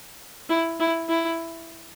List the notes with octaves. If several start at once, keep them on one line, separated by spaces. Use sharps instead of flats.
E4
E4
E4